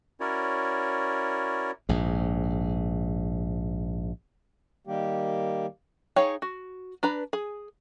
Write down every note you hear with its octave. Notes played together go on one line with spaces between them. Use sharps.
C#4 E4 F#4 A#4 C#5 D5
A#1 G#2
D#3 G3 A#3 G4
D#4 G#4 C#5 F5 G5
F#4
D4 B4 A#5
G#4